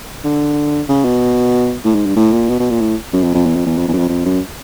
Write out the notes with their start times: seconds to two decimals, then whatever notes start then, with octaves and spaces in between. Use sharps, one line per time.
0.24 D3
0.88 C#3
1.04 B2
1.85 A2
1.95 G#2
2.06 G2
2.16 A2
2.32 A#2
2.49 B2
2.59 B2
2.70 A#2
2.81 A2
3.13 F#2
3.23 F2
3.34 F2
3.45 E2
3.56 F2
3.66 E2
3.77 F2
3.88 E2
3.93 F#2
3.98 F2
4.09 F2
4.25 F#2